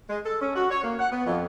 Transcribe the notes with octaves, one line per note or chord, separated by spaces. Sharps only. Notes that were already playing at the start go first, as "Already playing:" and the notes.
G#3
A4
C#4
F#4
C#5
A#3
F#5
B3
F2